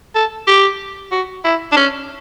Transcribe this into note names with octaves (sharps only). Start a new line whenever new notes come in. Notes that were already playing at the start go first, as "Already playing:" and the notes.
A4
G4
F#4
E4
D4
C#4